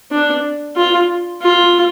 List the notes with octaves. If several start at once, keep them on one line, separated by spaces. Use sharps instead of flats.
D4
F4
F4